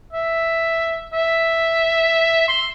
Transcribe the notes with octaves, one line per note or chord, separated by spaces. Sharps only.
E5
E5
C6